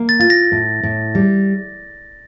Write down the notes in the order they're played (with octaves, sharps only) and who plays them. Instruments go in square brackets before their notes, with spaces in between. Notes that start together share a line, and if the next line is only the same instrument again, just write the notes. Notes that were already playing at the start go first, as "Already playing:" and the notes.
Already playing: [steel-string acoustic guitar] A#3
[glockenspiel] A6
[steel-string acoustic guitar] F4 [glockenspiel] A6
[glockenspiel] A#6
[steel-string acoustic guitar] A2
A2
G3